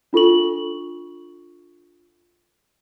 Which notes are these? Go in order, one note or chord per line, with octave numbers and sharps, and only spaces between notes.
D4 F4 A4 C#6 F#7